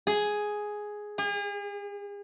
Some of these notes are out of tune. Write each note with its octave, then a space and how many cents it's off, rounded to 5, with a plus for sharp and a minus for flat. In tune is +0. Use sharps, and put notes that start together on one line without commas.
G#4 +5
G#4 -40